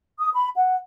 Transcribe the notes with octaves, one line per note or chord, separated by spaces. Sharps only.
D#6
B5
F#5